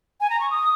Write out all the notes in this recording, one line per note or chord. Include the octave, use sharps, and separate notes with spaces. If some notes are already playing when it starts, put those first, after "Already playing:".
G#5
A#5
C#6
D#6